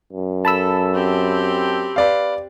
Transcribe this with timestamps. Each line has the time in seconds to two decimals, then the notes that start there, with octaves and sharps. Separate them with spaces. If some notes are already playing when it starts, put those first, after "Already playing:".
0.12 F#2
0.45 A4 A5 B5 E6
0.94 C4 G4
1.96 B4 D5 F5